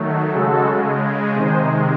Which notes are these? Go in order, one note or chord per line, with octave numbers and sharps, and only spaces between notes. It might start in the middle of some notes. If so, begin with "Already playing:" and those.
Already playing: D#3 F#3 A3
C#3 G#3 F#4 A4
C3 D#3 G#3 G#4 C5